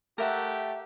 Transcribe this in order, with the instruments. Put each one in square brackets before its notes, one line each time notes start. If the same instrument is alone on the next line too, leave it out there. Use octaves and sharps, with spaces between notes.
[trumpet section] A3 G4 [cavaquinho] A#4 E5 F#5